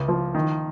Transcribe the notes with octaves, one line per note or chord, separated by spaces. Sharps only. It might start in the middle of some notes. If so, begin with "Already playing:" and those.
Already playing: C#2
F3
D#3